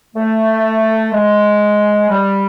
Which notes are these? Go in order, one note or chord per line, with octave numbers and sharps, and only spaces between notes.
A3
G#3
G3